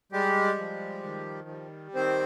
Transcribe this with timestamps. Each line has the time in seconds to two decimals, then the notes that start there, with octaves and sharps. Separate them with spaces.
0.12 G3 G#3 G4
0.58 F3
1.03 D#3
1.49 G3
1.94 D#3 C4 C5